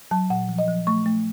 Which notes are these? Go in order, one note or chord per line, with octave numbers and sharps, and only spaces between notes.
F#3 A5
A#2 F#5
F3
D#5
F3
A3 C#6
A3